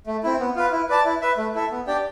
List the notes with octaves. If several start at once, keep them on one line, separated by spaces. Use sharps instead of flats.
A3
C4 E4
B3
F4 B4
E4
B4 D5 A5
E4
B4 E5
A3
E4 A4 E5
B3
D4 G4 D5 G5